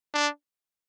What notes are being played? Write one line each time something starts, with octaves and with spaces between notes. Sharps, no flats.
D4